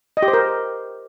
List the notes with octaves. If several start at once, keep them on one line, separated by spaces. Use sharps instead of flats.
D#5
G4
C5
A#4